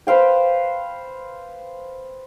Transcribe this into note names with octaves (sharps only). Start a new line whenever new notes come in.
B4 C5 F5 G5